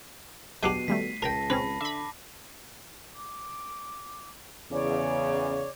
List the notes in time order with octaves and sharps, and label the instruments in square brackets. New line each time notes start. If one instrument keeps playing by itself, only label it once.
[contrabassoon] B2 [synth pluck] F#3 F#6 [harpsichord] G#3 D4 G4 [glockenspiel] C7 D#7
[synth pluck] D#3 G3 A3 [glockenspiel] B6
[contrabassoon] C#2 [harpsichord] A#4 G5 [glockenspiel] A5 A#6
[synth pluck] C4 C#4 G#4 [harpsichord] B4 [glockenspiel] B5
[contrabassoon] D3 [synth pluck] E5 B5 [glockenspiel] D6
[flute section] D6
[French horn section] E2 C#3 [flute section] C#5 D5 D6